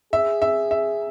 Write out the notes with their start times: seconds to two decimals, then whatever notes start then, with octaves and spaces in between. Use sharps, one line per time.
0.13 G#4 E5
0.42 E5
0.71 E5